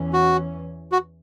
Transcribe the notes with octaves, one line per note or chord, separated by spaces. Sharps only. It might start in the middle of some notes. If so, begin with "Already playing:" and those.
Already playing: E2 E3 C#4
F#4
F#4